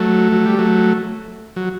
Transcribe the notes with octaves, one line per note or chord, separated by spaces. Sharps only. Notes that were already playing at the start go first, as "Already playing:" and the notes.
Already playing: F#3 A3
F#3
G3
F#3 A3
F#3